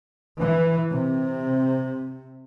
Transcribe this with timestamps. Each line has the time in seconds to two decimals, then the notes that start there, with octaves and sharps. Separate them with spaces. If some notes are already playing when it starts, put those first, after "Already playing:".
0.39 E3
0.92 C3